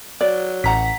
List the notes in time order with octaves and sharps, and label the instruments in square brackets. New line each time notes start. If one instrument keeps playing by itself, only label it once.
[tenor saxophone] F#3 [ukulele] D5
[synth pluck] A1 [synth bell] F#5 A#5 B6